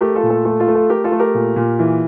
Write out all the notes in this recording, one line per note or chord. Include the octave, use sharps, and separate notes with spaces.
A3 G4 A#4
F4 A4
A#2
F4 A4
A3 F4 A4
F4 A4
A3
F4 A4
A3 G4 A#4
F4 A4
A3
G4 A#4
A#2
A#2
E3